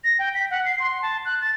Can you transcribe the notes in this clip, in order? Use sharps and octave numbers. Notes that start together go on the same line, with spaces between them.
A#6
G5
B6
F#5
C7
C6
A5
F#6
A6